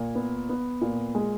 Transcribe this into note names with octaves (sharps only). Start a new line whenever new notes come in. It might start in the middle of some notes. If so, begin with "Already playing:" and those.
Already playing: A#2
B3
B3
A#2
G#3